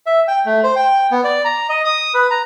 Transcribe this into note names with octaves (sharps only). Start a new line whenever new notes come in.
E5
G5
A3
C5
G5
B3
D5
A#5
D#5
D#6
B4
A#5